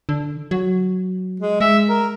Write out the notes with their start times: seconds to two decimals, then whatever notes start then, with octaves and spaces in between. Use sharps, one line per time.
0.09 D3
0.51 F#3
1.40 G#3
1.61 G#3 E5
1.89 A#4